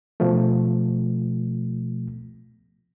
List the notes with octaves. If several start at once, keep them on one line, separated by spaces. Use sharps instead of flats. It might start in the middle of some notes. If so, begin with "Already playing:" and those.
B2 F3 A3